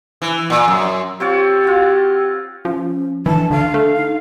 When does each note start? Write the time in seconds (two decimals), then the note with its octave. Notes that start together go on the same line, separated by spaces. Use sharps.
0.22 E3
0.50 A#2
0.68 F#2
1.20 C4 F4 G4 C#5
1.64 F4 F#4
2.65 F3 C#4
3.26 E3 D4 A5
3.51 D2 F5
3.74 A3
3.96 D#4